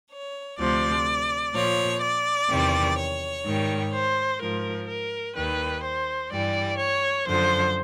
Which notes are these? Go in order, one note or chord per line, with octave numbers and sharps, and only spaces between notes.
C#5
D2 C3 F3 D5
A#2 F3 C#5
D5
E2 C3 D#3 G3
C#5
G#2 D#3 G3
C5
G#2 F3 A#4
A#4
D#2 D#3 G3 B4
C5
G2 E3 G3 D5
C#5
F#2 D3 F3 C5